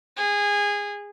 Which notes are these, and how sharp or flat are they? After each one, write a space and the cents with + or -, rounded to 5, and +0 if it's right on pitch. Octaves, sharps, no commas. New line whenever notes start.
G#4 -20